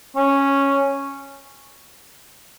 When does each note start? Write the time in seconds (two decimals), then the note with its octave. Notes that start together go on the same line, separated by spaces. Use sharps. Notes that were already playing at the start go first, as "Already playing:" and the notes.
0.16 C#4